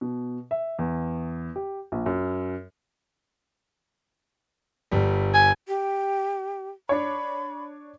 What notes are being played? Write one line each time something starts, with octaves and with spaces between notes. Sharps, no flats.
B2
E5
E2
G4
A#1
F#2
G1 G3
G#5
G4
D4 C#5 B5